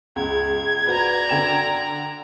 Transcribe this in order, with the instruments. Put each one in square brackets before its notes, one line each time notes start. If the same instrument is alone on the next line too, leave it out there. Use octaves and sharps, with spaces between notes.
[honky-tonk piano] C#2 [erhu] G#6
[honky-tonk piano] F#4 B4 [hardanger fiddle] D5 A#5
[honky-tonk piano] D3 G5 E7